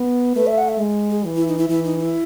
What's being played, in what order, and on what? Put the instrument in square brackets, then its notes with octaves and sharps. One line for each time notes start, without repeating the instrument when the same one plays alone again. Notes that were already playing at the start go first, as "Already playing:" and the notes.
Already playing: [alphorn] B3
[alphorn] A3 [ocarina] B4
[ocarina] E5
F#5
E5
[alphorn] G#3
[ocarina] G#4
[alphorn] E3
[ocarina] E4
D#4
E4
[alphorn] E3 [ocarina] E4
[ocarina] D#4
E4